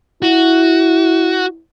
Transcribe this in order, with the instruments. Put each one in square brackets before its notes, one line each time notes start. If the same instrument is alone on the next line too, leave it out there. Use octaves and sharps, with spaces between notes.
[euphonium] E4 [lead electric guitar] F#4